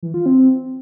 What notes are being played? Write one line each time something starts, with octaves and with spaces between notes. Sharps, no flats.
E3
F4
C4